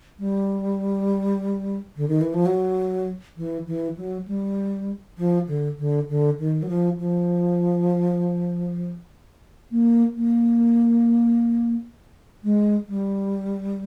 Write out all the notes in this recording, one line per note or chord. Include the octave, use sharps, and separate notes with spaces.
G3
D3
D#3
E3
F3
F#3
E3
E3
F#3
G3
F3
D3
D3
D3
D#3
F#3
F3
F3
A#3
A#3
G#3
G3